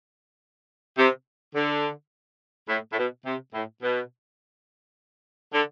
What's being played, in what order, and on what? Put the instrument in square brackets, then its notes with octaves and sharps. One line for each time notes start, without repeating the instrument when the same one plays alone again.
[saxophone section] C3
D3
A2
A2
B2
C3
A2
B2
D3